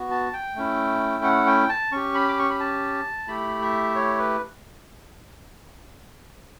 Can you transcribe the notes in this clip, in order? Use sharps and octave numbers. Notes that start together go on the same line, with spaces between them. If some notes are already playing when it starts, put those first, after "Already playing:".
Already playing: B3 F#4
A5
G5
A3 C#4 E4
F#5
G5
A5
C#4 G4 C#6
B5
D6
C#6
B5
A5
A3 E4 G4 B5
E5
C#5
B4